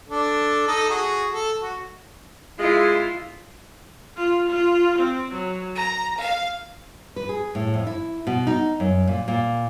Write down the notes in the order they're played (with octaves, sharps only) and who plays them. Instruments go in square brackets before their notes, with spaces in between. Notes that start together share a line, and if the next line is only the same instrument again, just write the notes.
[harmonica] D4 A4
D#4 A4 D#5
F#4 G#4
A4
F#4
[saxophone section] G#3 [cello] E4 F4
[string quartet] F4
F4
C4
F#3
A#5
F5
[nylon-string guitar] B4
G#4
A2
F2
E4
B2
D#4
F#2
A#2
A#2